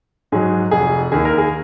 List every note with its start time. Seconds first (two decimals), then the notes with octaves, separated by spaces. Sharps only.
0.32 G#2 F#3 G#4
0.71 F1 G#4
1.12 D#2 D#3 G#4
1.25 A#4
1.38 G#4